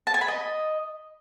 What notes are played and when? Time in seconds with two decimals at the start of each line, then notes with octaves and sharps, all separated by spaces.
0.07 A5
0.14 G#5
0.21 B5
0.28 D#5